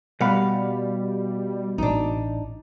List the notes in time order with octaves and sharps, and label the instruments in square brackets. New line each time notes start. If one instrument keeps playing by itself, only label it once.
[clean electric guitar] B2 F#5 B5 [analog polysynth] G3 [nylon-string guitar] F5
[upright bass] A1 [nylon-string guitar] D4 D#4